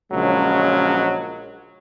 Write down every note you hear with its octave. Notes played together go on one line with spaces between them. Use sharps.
A#1 C#3 F#3 G#3